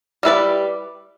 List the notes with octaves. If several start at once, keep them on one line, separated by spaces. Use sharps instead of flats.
G3 E4 B4 D5